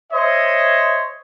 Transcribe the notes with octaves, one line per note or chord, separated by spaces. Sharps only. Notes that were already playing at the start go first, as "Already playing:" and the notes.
C5 C#5 D#5 E5